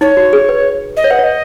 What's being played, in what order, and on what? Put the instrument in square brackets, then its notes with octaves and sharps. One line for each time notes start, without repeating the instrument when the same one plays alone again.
[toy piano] D#4 [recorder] C#5
[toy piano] F#4
G#4
B4
[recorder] D#5
[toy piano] C#5
[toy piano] B4 [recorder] F#5
[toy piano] C#5
[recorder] D#5